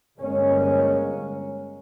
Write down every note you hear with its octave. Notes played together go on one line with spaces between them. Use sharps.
G1 G#3 A#3 C#4